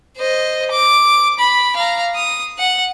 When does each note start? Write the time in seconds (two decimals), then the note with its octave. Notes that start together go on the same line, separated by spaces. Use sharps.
0.17 C5 D#5
0.71 D6
1.39 B5
1.76 F5 A#5
2.16 D#6
2.58 F#5